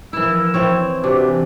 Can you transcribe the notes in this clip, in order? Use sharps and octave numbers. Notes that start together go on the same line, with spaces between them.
E3 F3 E4 A#4 E6
E3 C4 C#5
C3 D4 F#4 G4 B4
E3